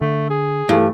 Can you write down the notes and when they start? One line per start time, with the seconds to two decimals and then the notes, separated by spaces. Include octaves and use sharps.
0.01 D3 A3
0.30 G#4
0.69 G2 E3 A3